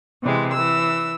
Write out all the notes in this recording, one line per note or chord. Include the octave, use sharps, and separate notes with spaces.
C3 E3 G#3
E3 E6